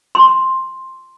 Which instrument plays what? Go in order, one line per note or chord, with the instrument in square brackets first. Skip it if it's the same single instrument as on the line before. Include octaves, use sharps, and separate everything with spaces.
[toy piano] C6